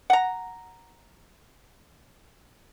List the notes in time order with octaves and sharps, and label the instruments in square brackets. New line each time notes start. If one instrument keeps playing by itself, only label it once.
[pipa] F#5 A#5